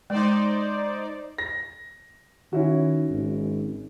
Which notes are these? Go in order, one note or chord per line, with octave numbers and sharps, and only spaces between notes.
G#3 D#4 C5 D5
A#6
D#3 C#4 E4 F#4
G#1